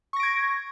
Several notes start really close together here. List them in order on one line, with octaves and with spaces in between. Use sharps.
C#6 A#6 D7 G#6